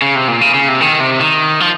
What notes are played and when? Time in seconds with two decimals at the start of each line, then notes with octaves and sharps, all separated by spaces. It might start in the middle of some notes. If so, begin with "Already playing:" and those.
0.02 C#3
0.15 C3
0.28 A#2
0.41 C#3
0.54 C#3
0.68 C3
0.81 D#3
1.00 C3
1.20 D#3
1.60 F3